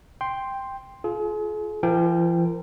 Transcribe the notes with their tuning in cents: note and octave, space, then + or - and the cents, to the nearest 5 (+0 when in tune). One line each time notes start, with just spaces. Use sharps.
G5 +5 C6 +0
F4 +0 G#4 +40
F3 -45 A#4 -25 G5 +0